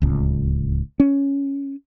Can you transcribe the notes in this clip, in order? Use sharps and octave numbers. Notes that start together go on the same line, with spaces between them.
D1 C#2
C#4